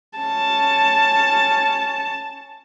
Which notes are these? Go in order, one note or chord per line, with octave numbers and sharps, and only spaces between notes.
C#4 A5